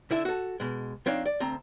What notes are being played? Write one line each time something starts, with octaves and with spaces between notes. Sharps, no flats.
D3 E4 E5
F#4 A4
B2 G#3
F3 C4 D4 D#4 C#5 F5
D5
D2 C4 A#5